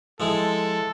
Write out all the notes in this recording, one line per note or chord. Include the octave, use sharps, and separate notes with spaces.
F3 G#3 E4 A4